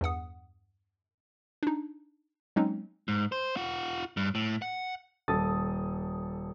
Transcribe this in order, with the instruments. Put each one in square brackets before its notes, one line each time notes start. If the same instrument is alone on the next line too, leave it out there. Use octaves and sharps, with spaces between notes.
[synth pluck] E2 G2 F#5 D#6
D4 D#4
F#3 G#3 A#3 C4 C#4 D#4
[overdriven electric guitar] G#2
C5
F4 F#5
G2
A2
F#5
[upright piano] D#1 A4 D#6 A6